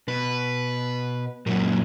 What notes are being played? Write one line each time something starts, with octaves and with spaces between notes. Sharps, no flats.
B2 B4
F#2 A#2 A#3 C#4 F#4